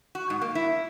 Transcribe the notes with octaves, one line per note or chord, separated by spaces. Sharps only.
F#4
G#2
A#3
E4